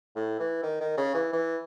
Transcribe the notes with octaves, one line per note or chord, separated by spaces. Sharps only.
A2
E3
D#3
D#3
C#3
E3
E3